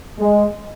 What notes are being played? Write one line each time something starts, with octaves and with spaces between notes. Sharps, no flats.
G#3